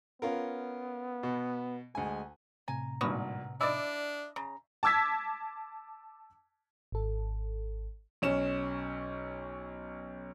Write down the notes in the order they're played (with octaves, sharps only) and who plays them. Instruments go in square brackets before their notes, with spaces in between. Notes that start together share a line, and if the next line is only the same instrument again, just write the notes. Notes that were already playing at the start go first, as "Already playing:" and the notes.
[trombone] B3 [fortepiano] C#4 F4 A#4
[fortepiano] B2
[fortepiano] D2 G#5 [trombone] G#3
[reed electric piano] A2 C3 A#5 [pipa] G#5
[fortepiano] G#1 G2 A#2 [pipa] B3 F#4
[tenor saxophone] D4 [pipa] E4 D5 [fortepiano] D#5 D6 E6
[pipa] C#3 [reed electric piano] A#5
[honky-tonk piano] A5 D6 E6 G#6 B6
[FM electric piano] G#1 A4
[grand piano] B1 C#4 E7